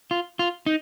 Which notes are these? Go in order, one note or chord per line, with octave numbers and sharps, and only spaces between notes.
F4
F4
D#4